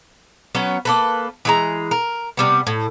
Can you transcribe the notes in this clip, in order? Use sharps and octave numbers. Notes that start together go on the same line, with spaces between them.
F#3 B3 C#4
A#3 A4 B4
E3 G#3 A#5
A#4
C3 G3 B3
A2